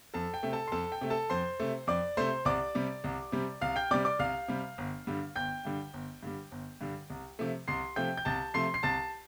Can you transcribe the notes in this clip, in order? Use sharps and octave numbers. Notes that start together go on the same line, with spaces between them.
F2 A4 A5
G5
C3 A3
A4 A5
C6
F2 A4 A5
G5
C3 A3
A4 A5
F2 C5 C6
C3 A3
F2 D5 D6
C3 A3 C5 C6
C2 D5 D6
C3 G3
C2
C3 G3
C2 F5 F6
G5 G6
C3 G3 D5 D6
D5 D6
C2 F5 F6
C3 G3
G1
G2 D3 G3
G1 G5 G6
G2 D3 G3
G1
G2 D3 G3
G1
G2 D3 G3
C2
C3 F3 A3
C2 C6 C7
C3 F3 A3 G5 G6
G6
C2 A5 A6
C3 F3 A3 C6 C7
C7
C2 A5 A6